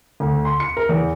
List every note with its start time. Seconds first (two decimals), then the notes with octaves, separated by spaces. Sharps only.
0.20 D2
0.45 C6
0.60 C#7
0.77 A#4
0.89 E2